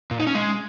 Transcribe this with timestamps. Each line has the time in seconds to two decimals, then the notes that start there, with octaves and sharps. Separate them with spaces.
0.11 A#2
0.19 D#4
0.27 C#4
0.35 G#3